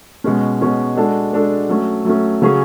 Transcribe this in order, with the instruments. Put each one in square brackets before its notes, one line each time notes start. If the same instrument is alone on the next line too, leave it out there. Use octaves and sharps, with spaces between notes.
[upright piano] B2 G#3 C#4
B2 G#3 C#4
G#3 D4 F#4 A4
G#3 D4 F#4 A4
F#3 A3 C#4
F#3 A3 C#4
C#3 F#3 C#4 G#4